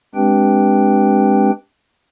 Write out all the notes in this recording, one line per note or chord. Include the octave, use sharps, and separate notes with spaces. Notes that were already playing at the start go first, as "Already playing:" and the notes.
G#3 C4 D4 G4 B4 G5